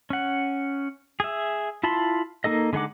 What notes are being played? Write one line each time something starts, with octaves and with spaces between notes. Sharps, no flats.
C#4 F#5
G#4 E5
E4 F4 A5 B5 C6
A#3 D#4 A4 D#5
D3 G#3 D#4 F#5 D6